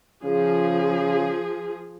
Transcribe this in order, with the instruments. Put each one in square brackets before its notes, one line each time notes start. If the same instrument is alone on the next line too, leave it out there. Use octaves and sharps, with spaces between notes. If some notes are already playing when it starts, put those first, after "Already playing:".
[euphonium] C#3 [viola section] F3 G#4